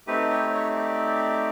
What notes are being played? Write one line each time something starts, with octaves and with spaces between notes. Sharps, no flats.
A3 C4 D#4 G4 B4
C#5
C#5
D5